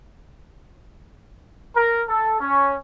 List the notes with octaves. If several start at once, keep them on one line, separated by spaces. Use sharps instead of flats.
A#4
A4
C#4